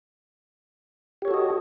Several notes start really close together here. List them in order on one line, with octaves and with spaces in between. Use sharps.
G4 C#5 A4 F#4 D#5